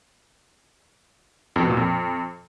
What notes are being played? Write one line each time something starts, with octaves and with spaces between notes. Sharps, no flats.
F2
B2
A#2
F2